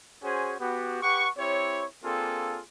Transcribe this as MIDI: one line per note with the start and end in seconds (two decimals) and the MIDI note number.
0.23 0.56 61
0.23 0.56 66
0.23 0.56 68
0.23 0.56 72
0.60 1.00 59
0.60 1.00 66
0.60 1.00 67
1.02 1.28 67
1.02 1.28 71
1.02 1.28 78
1.02 1.28 85
1.38 1.85 60
1.38 1.85 64
1.38 1.85 67
1.38 1.85 73
2.04 2.60 58
2.04 2.60 60
2.04 2.60 62
2.04 2.60 65
2.04 2.60 68
2.04 2.60 69